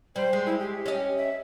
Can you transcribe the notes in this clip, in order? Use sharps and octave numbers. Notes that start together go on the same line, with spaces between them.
G3 C5
G#3
E4
G4
C#4 D#5
E5